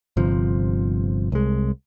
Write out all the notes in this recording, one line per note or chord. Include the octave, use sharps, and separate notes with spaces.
G1 C3 F3
C2 G#3